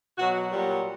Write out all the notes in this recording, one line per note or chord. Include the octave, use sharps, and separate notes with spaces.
B2 F#3 F#4
A#2 F#3 G3